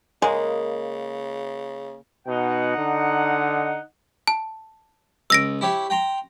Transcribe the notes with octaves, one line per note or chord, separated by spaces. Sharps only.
C#3 G#3 A#3
B2 D#4 F#5
D3
A5
C#2 E6 A#6 D7
E4 G4 C#5
G5 A#5 C6